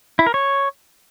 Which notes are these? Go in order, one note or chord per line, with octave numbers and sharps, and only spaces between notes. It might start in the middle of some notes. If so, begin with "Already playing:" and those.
E4
A#4
C#5